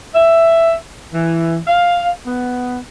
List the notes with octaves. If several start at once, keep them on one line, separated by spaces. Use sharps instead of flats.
E5
E3
F5
B3